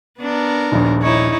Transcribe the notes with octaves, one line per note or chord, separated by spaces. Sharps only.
B3 D4 A#4
D#1 A#1
D#4 E4 C#5